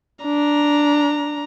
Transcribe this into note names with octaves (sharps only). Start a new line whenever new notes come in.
D4 A#5